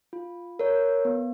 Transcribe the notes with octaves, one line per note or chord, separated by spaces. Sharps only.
F4
A#4 C#5
B3